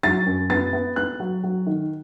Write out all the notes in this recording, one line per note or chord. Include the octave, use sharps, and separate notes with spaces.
F#3 A6
F#2
B3 A6
B3
B3 F#6
F#3
F#3
D#3